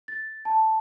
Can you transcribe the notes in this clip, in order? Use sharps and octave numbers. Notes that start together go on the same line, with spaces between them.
A6
A5